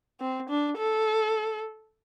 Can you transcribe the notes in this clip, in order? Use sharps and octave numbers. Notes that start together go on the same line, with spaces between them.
C4
D4
A4